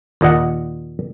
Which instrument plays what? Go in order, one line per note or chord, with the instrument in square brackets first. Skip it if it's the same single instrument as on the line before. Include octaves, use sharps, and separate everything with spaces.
[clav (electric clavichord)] D#2 A#2 D#5 F#5